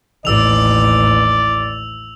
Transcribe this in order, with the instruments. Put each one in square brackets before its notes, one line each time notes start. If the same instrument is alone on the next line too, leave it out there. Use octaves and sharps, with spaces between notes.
[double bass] A1 D#2 [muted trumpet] D5 [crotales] E6 F7